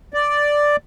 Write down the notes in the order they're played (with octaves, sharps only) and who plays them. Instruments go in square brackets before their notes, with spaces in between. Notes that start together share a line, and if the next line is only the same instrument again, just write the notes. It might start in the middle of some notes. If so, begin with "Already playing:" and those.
[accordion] D5